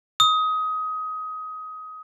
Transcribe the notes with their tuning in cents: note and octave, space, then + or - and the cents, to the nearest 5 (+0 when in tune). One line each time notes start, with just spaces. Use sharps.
D#6 +20